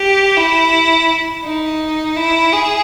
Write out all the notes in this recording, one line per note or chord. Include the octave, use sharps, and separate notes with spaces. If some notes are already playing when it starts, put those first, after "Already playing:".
Already playing: G4
E4
D#4
E4
G#4